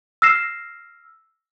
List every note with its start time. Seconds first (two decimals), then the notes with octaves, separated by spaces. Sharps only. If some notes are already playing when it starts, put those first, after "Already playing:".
0.22 E6 F6 A#6 C7 E7